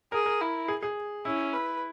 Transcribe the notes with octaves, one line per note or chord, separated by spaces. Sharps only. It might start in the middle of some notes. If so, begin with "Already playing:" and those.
G#4 A#4
A#4
E4
G#4
G#4
C#4 E4
B4